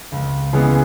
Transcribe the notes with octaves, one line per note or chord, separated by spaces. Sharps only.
C#2
C#3 E3 G#3 B3